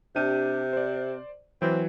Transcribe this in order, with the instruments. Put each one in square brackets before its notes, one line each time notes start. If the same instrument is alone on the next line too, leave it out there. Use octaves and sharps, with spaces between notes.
[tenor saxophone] C3 [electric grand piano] D4 G4 D#7
[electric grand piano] C5 D5
[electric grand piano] E3 F#3 B4 [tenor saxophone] C4